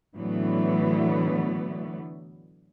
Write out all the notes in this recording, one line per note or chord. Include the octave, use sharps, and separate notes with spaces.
A2 D3 E3 F#3 A3 B3